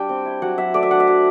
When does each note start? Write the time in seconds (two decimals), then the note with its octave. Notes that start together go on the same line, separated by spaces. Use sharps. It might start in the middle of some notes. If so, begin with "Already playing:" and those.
Already playing: G3 D4 G5
0.09 C4
0.25 E4
0.42 F#3 F#5
0.58 F#3 E5
0.74 A3 D5
0.83 E5
0.91 D4 F#5
1.00 E5
1.07 F#3 F#5